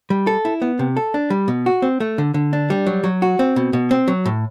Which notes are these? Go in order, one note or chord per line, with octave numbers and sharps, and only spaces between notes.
G3
A4
E4
B3
C3
A4
D4
G3
B2
F#4
C4
A3
D3
D3
D4
G3
F#3
F#3
F#4
C4
B2
B2
C4
F#3
A2